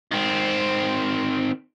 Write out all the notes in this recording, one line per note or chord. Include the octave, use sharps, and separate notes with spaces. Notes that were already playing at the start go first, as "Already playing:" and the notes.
D#3 C4